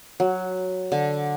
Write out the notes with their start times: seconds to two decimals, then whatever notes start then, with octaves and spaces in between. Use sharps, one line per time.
0.20 F#3
0.92 D3